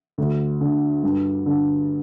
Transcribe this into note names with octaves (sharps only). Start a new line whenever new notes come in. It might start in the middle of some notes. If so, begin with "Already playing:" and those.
D2
D3
G2
D3